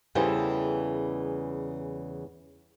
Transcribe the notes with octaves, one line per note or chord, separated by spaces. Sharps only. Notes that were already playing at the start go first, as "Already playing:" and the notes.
E2 C#3 E3 G3 A4 C5